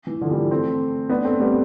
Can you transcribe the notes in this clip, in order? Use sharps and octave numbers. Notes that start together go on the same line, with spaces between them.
E3
D3 F3
E3 G3
A3 C4
B3 D4
A3 C4
G3 B3